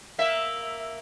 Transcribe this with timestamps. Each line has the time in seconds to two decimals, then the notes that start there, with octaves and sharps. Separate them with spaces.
0.18 A#3 E5